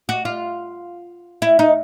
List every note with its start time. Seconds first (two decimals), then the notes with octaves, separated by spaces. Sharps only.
0.09 F#4
0.25 F4
1.42 E4
1.59 D#4